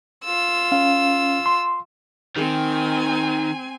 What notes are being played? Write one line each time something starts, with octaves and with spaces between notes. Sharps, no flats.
F4 E6
C#4 F5
C6
D#3 C4 G#5